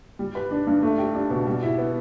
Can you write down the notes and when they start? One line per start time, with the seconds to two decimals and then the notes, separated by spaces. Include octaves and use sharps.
0.19 G3
0.35 B4
0.51 D4
0.67 G2
0.82 A3
0.98 G4
1.14 D4
1.30 B2
1.46 G3
1.62 E4
1.78 B3